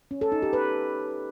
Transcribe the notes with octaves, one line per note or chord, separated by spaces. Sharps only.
C#4
A4
D#4
G4
B4